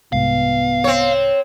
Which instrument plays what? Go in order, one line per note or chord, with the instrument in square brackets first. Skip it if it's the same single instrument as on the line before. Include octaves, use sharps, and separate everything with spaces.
[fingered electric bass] C2 G#2 C3 [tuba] B3 [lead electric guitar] F5
[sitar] C4 C#5